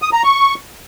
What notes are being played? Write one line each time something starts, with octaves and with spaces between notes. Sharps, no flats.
D#6
A#5
C#6